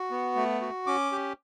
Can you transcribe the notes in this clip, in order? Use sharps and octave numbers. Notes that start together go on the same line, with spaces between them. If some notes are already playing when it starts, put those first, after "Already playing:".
Already playing: F#4
B3
A3
F#4
C#4 D6
G4